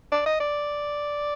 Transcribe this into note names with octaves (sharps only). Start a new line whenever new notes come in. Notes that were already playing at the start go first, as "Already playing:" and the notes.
D5
D#5
D5